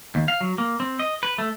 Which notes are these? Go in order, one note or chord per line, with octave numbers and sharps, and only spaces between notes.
D#2
F5
F#3
A#3
C4
D#5
B4
A3